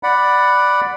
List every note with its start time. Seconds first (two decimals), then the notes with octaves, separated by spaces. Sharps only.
0.03 D5 F#5 B5